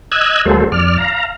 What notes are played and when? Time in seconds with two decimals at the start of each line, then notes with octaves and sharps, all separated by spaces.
0.12 D#5 E6 F#6 G#6
0.45 D2 F#3 G#3 A#3 A4 C5
0.72 F2 D5 F6
0.98 F5 A#5